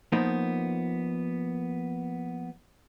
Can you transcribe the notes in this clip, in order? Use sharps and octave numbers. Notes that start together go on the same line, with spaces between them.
F3 A#3 B3 D#4